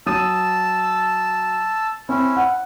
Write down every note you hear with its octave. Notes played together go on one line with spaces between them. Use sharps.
F#3 A5 D#6 E6 D#7
C4 C#4 E4
F#5